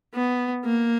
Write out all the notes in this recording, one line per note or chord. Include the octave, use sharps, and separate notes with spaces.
B3
A#3